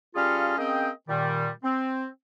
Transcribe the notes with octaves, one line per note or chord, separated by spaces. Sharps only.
G3 C#4 F4 G#4 A4 F5
A#3 C4 C#4 G#4 D#5 G5
A#2 D#3 G3
C4